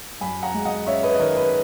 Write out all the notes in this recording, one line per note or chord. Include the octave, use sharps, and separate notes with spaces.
F#2 G#5 B5
F#5 A#5
G#3
D#5 F#5
C#4 C#5 E5
B4 D#5
D#5
D#3 A#4 C#5
B4